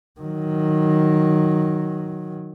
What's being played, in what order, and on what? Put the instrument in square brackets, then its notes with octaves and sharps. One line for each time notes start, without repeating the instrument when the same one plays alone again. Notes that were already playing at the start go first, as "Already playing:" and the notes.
[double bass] D#3 F#3